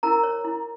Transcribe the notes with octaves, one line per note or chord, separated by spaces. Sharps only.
E4 A#4 A#5
C#5
E4